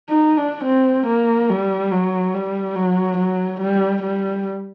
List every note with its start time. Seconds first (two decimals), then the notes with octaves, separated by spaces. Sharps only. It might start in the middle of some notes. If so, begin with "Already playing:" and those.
0.09 D#4
0.38 D4
0.65 C4
1.07 A#3
1.50 G3
1.91 F#3
2.34 G3
2.76 F#3
3.18 F#3
3.61 G3
4.03 G3